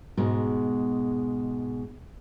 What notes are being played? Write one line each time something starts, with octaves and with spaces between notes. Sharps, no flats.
G#2 B2 G#3